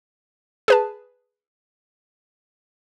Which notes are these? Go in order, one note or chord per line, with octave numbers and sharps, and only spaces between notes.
G#4 B4 A5